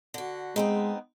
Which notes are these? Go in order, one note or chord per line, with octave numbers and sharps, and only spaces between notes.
D3 F#4
G#3 B3 C4 D#4